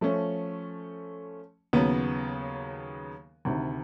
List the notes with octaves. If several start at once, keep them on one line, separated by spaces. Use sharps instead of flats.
F3 A3 C#4
D#2 C#3 F#3 B3
D2 C3 D#3